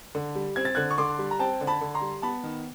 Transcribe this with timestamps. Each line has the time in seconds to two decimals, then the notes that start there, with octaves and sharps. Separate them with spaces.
0.15 D3
0.35 G3
0.56 C4 G#6
0.65 A6
0.75 D3 F#6 G#6
0.91 C#6
0.98 D3 C6 D6
1.19 G3
1.31 A#5
1.39 C4 G5 A5
1.61 D3
1.67 A5 B5
1.81 D3
1.95 A#5 C6
2.01 G3
2.22 B3 A5 B5
2.44 D#3